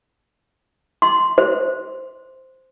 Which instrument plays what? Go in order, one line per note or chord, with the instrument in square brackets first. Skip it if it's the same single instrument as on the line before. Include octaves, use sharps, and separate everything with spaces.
[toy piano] C6
C5